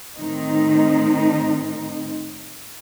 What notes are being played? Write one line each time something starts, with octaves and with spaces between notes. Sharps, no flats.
A2 D#3 C4 D#4